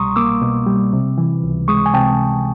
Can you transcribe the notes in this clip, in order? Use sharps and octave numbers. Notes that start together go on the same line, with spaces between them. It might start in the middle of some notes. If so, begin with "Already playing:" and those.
Already playing: C2 B2 G3 A#5 C6 C#6 D#6
A#3 D6 E6
B2
G3
C3
E3
C#2
G#3 C#6 D#6
G#5
C3 G5 A5